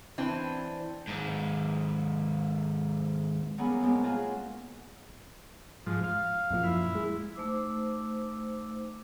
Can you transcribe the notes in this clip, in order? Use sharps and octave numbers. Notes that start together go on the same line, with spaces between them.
E3 C4 D4
D#2 G#2
F#3 G3 A#3 B3 C#4 G#4
B2 G#3 A#3 C4
C#4 F4 F#4 G#4
G#2 F3
F5
F#2 A#2 F3
E4
G#3
A3 D#4 C5 D6 E6